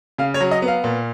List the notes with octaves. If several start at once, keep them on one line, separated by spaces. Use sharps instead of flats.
C#3 F5
C#5
F#3
D#5
B3
F5
A#2